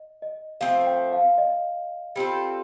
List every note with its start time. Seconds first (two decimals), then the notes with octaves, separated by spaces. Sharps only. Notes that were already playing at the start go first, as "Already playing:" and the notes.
Already playing: D#5
0.22 D#5
0.61 F3 A3 C4 F5
0.87 G5
1.13 F5
1.38 D#5
2.16 G3 C4 F4 A4